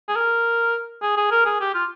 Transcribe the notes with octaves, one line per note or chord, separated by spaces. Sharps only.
G#4
A#4
G#4
G#4
A#4
G#4
G4
F4